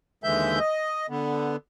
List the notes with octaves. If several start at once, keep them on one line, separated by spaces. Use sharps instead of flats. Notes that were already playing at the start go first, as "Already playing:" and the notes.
D#2 D3 E3 G#3 E5 G6
D#5
D3 B3